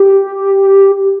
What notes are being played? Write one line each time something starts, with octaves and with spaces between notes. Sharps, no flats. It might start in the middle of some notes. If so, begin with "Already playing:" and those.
Already playing: G4